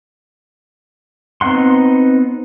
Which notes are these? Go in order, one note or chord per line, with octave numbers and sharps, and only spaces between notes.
B3 C4 D#4 F#5 C6